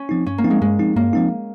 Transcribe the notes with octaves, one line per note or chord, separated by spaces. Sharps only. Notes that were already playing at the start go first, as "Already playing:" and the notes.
Already playing: C#4
F3 C4 D#4
G2 C#4
A#3
F3 C4 D#4
G#3
G2 G#3
F3 C4 D#4
G2 A#3
F3 C4 D#4